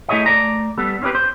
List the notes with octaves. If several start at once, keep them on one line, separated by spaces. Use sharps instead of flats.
A3 E4 G#4 C#5 D#5 E5
A3 D5 A#5
G3 B3 A4
C4 C#4 E4 G4 B4
C5